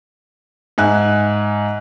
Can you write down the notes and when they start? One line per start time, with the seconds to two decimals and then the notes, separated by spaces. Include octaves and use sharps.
0.78 G#2 E5 G#5 F#6